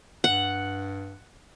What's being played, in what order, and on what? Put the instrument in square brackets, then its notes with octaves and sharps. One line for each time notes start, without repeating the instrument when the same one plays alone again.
[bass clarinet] G2 [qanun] F#5